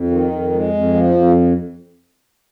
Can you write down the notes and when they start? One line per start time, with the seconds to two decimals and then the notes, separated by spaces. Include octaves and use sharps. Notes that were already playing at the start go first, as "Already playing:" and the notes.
Already playing: F2
0.10 D#3
0.32 F2
0.53 G#3
0.73 F2
0.94 F3
1.14 F2